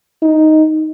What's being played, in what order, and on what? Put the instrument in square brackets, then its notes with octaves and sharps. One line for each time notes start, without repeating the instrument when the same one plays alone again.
[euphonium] D#4